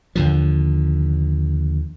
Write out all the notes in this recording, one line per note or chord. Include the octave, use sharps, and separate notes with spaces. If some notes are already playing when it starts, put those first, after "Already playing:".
D#2 D3 F3